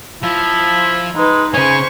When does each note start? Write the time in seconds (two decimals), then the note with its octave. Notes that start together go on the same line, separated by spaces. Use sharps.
0.23 F3 E4
1.15 G#3 D#4 B4
1.54 C#3 C#4 C5 G#5 C#6